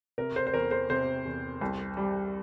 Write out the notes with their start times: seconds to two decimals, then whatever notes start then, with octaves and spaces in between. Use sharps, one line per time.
0.18 C3 A#4
0.36 C5
0.47 C5
0.54 E2 A#4
0.71 C5
0.90 C3 C5
1.26 E2
1.61 C2
1.97 G3